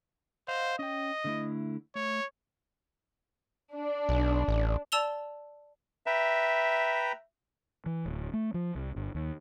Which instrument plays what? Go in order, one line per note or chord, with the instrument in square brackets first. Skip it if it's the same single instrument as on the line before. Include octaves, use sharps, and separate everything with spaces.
[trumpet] C5 [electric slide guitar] D#5 F5 F#5
[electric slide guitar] C#4 G5 [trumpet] D#5
[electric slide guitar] D3 A3 E4
[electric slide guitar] A3 [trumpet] C#5
[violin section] D4
[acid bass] B1
A1
[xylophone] D5 A5 E6 F7 G7
[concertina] B4 G5 A#5 [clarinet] E5
[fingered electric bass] E3
D1
A3
F3
C2
G1
D#2